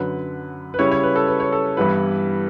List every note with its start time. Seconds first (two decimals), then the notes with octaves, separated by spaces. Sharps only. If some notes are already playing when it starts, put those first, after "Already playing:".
Already playing: F#2 D3 F#3 B4
0.74 B4
0.79 C#3 G3 C#4 E4 C#5
0.92 C#5
1.03 B4
1.16 A4
1.28 B4
1.40 C#5
1.52 A4
1.77 G2 E3 G3 B3 E4 B4